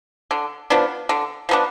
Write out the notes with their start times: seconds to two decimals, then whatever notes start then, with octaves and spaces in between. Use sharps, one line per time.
0.31 D3
0.70 F3 B3 D4
1.09 D3
1.49 F3 B3 D4